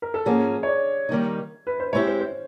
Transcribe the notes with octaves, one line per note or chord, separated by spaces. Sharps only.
A#4
A4
G#2 F3 A#3 C#4 G#4
C#5
D5
D#3 G3 A#3 D#4
B4
C5
G#3 C4 E4 G4 C#5
C5
C5